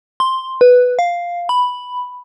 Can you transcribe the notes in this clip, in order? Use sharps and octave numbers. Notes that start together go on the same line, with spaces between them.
C6
B4
F5
B5